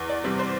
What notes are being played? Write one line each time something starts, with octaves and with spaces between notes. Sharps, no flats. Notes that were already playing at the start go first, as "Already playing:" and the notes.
Already playing: E2
D5
C3 G3 C4
C5